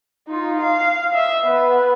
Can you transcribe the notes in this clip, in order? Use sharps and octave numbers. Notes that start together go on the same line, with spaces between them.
D#4 F4
F5
D#5 E5
B3 B4